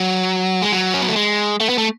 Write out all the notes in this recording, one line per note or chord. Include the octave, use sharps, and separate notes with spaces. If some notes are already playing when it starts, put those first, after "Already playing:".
Already playing: F#3
G#3
F#3
C#4
B3
A3
G#3
A3
B3
A3